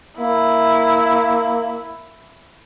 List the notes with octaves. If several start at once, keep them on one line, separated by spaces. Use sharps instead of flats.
A#3 E4